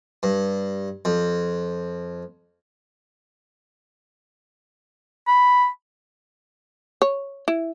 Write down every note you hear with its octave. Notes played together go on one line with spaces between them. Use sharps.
G2
F2
B5
C#5
E4